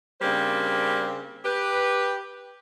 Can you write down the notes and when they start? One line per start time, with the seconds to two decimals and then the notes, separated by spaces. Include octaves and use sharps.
0.21 C#3 G3 A#3 C4 D4 C5
1.44 G4 B4